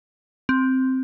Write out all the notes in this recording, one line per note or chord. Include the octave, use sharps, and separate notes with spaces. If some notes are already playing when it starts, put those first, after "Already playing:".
C4